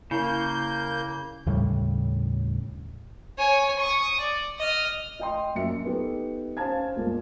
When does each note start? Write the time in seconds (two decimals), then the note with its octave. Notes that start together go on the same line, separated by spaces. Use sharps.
0.11 C#3 A#3 E4 G6
1.46 D#2 A2 C#3 G3
3.38 C#5 G#5
3.79 C#6 D#6
4.20 D5
4.58 D#5 F6
5.20 D#5 G5 C6
5.55 A#1 F#2 E5 C#7
5.84 B3 D#4 G4 A4
6.57 C#4 C5 F5 A5 G#6
6.96 G1 C#2 A#3 F4